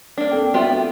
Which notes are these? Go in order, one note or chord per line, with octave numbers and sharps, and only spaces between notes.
A#3 D4
C4 A4 G5
B3 F4 F#4 E5 G5